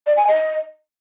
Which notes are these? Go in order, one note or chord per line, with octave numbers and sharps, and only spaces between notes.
D5
G#5
D#5